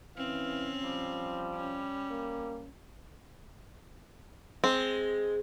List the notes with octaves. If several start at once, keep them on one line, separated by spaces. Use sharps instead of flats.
E3 C4 C#4 F5
F3 G3
C#4
A#3
G#3 C4